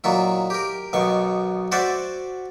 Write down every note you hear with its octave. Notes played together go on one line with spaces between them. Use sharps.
A#2 D#3 F#3 E4
G4 A#4
B1 B2 D#3 C#6
F#4 C5 D5 E5 F#5